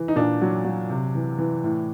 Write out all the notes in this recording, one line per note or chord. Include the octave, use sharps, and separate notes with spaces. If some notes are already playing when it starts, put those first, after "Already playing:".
Already playing: E3
D#4
A#2 D4
F#3
F#3
C3
E3
E3
A2